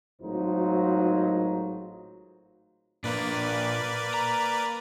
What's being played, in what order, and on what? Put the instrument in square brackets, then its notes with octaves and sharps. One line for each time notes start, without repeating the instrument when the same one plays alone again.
[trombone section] G#1 A2 F#3 D#4 F4 C5
[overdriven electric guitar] A#2 D4 [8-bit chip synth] A#3 B4 D5
[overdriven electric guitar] A#5